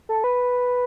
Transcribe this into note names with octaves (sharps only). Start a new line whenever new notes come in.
A4
B4